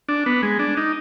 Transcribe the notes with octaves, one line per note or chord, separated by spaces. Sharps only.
D4
B3
G#3
D4
D#4